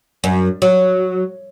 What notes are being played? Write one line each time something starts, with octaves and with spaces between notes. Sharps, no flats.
F#2
F#3